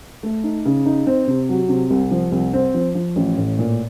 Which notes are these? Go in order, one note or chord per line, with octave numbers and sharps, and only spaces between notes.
A3
D#4
C#3
D#4
C4
C3
F#3
C3
C2
F3
C2
C4
F3
F3
A1
A2
A#2